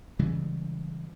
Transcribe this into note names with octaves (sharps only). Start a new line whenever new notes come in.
C#3 E3 G3 G#3